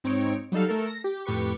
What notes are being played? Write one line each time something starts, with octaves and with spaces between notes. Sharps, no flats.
G#2 C4 D#4 C#5 D7
F#3 G3 D#4 A4 F5
A3 A4 A#4
A#6
G4
F2 A2 G4 B4 C#6